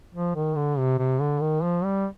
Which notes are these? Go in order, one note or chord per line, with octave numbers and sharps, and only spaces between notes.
F3
D#3
D3
C3
C3
D3
D#3
F3
G3